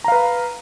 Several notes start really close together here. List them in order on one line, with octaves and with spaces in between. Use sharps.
A#5 F5 B4